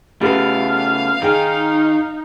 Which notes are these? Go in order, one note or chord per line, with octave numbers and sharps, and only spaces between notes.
C#3 A3 B3 G4 A4 B4 F5
D#3 D#4 G#4 G5